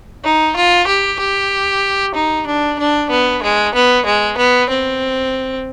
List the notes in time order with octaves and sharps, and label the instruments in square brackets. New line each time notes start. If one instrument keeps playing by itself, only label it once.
[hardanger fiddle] D#4
F4
G4
G4
D#4
D4
D4
B3
G#3
B3
G#3
B3
C4